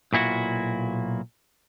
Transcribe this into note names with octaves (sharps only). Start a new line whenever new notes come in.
B1 A#2 E4 F#4